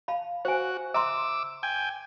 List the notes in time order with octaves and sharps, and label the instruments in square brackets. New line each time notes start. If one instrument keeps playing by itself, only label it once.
[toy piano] F5 A5 B5
[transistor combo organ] F#4 [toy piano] C5 G#5
[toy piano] E5 A#5 C6 [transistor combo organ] D6 E6
[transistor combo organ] G5 G#5